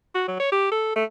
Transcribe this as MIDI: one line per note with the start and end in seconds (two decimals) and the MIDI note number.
0.15 0.23 66
0.28 0.38 54
0.40 0.49 73
0.52 0.69 67
0.72 0.92 69
0.96 1.04 57